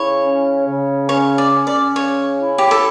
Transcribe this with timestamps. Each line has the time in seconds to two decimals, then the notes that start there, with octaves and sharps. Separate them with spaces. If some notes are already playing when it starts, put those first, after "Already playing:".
Already playing: C#3 E4 C#5
0.22 C#4
0.65 C#3
1.09 C#4 C#5
1.38 D5
1.52 C#4
1.67 D5
1.96 C#3 C#5
2.40 E4
2.58 G4
2.71 A4